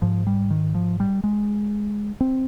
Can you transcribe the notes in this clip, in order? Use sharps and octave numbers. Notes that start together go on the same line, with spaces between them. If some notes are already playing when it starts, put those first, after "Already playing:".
G#2 F3
G3
D#3
F3
G3
G#3
C4